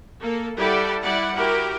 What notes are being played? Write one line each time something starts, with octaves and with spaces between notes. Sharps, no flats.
A#3 A4
G3 E4 G4 A4 D5 F#5
G3 E4 D5 F#5
E4 F#4 G4 A#4